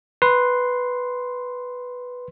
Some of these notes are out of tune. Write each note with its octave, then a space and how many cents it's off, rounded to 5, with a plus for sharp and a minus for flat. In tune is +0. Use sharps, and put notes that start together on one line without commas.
B4 +0 C6 +0